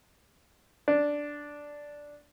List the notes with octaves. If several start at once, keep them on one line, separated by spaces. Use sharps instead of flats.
D4